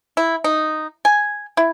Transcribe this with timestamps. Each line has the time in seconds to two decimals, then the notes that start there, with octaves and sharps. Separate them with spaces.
0.17 E4
0.44 D#4
1.05 G#5
1.57 E4